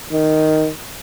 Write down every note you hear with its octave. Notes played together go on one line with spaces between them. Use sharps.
D#3